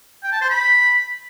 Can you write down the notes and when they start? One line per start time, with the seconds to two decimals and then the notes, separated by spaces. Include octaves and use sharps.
0.23 G5
0.32 A5
0.41 C5
0.50 B5